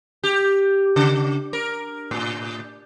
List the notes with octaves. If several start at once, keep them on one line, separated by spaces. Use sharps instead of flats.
G4
C#3
A#4
A2